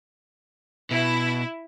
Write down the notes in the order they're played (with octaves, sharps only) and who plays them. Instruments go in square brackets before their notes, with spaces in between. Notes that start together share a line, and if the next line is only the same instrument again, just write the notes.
[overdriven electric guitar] B2 [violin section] E4